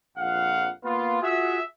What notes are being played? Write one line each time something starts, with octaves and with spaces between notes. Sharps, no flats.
A#1 F2 F5 F#5
A#3 B3 F4
F4 F#4 G#4 E5